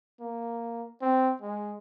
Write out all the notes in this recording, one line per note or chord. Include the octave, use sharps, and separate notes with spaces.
A#3
C4
G#3